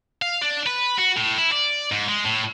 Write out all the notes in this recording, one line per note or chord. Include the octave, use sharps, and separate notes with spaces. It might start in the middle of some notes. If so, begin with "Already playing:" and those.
F5
D4
B4
F#4
A2
E4
D5
G#2
G#3
A2